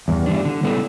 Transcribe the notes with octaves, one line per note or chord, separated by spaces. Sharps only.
E2 G2
E3 G3 D4
D3
G3 B3 E4 A4